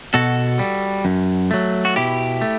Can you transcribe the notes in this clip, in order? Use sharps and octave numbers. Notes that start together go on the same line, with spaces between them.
B2 F#4 A4
G3
F#2
F#3 A3
F#4
B2 E4 G4
A3